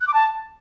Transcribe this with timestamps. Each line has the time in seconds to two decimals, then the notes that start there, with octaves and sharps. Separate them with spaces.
0.01 F#6
0.07 D6
0.14 A5